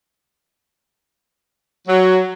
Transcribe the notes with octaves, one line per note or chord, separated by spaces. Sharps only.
F#3